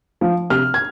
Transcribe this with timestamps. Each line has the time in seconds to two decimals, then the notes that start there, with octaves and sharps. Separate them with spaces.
0.21 F3
0.50 C3 F6
0.74 G#6